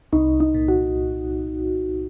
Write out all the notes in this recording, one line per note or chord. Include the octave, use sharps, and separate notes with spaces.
C2 D#4
D#4
A#2
F#4